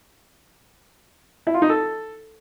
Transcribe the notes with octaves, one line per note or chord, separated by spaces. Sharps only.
E4
F4
D#4
A4